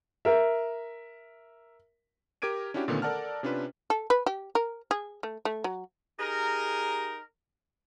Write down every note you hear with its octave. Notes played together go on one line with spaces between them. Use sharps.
A#4 E5
G4 A#4 D6 G#6 D7 D#7
C#4 D4 E4 F#4 G4
A#2 D3 D#3 A3 B3 C#4
A4 A#4 D5 F#5 A5 F6
C3 C#4 D4 F4 B4
A4
B4
G4
A#4
G#4
A3
A3
F#3
D#4 G4 G#4 A#4